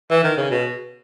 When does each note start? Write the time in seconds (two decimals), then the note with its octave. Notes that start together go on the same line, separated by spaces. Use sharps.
0.11 E3
0.24 D#3
0.37 C#3
0.50 B2